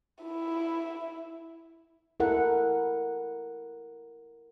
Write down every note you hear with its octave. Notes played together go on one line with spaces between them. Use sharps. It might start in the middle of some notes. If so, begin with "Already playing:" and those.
E4
E4 A4 A#4 F#5